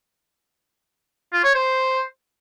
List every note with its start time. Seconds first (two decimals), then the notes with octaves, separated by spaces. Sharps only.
1.33 F4
1.44 C#5
1.55 C5